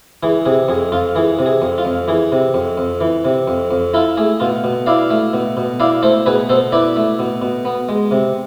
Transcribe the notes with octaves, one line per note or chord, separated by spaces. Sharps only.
E3 G#4
C3 G#4
F2 G#4
F2 F4
E3 G#4
C3
G#4
F2
F4
F2
E3 G#4
C3
F2
F2
E3
C3
F2
F2
E4 F4 A4
A3 G#4
B2 F4
B2
E4 D5 F5
A3
B2
B2
E4 D5 F5
A3 A4 C5
B2 G#4 B4
B2 A4 C5
E4 B4 D5
A3
B2
B2
B3
G#3
C3